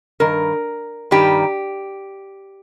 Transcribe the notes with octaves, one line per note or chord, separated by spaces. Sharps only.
G2 D#3 A#4
G2 D#3 G3 G4